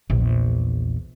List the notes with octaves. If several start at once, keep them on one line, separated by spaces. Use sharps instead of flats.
A#1 E2